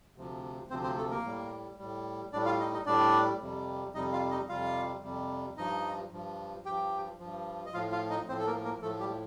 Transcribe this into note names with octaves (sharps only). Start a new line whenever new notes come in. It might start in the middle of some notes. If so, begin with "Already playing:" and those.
D2 C3 F3
D2 C3 F3 C4 C5
C4 C5
A3 A4
A#3 A#4
A2 G3
A2 G3
A2 G3 D4 D5
F4 F5
D#4 D#5
D#4 D#5
A2 G3 D4 D5
F2 C3 G3
F2 C3 G3 D#4 D#5
F4 F5
D#4 D#5
F2 C3 G3 F4 F5
F2 C3 G3
G2 F3 D#4 D#5
G2 F3
G2 F3 G4 G5
G2 F3
D#5
A2 F3 F4 F5
F4 F5
D#4 D#5
A2 F3 C4 C5
A4
A#3 A#4
A#3 A#4
A2 F3 A3 A4
G3 G4